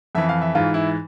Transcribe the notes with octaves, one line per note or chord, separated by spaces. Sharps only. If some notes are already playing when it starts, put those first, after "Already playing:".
F2 E3 E5
F5
E5
G#2 E3 F4
E4